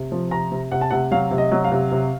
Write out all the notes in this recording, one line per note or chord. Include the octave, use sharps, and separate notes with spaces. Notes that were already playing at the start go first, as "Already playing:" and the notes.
Already playing: C3
F3
C3 A#5
C3
C3 F#5
A5
C3 F#5
F#3 F5
C3
D#5
F#3
F5
C3
C3